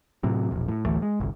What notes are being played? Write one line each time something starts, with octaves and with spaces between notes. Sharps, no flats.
A2 C3 F#3
E1 A#1
A2
A1 D2 E3 A3
G#3
G1 C2